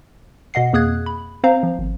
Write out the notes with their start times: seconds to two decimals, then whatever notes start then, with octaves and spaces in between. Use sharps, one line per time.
0.54 B2 D#5 F#5 C7
0.73 F2 A#3 G#4 D#6 F#6 G#6
1.06 B5
1.44 C4 C5 F5 A#5
1.63 F3
1.78 G#1